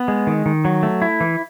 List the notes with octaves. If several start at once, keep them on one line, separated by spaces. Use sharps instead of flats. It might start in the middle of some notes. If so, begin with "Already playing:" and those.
Already playing: B3
G#3
D#3
D#3
F#3
A3
E4
E3